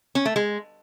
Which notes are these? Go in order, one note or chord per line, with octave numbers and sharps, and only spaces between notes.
C#4
A3
G#3